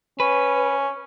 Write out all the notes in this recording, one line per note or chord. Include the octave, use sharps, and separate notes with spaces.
C#4 B4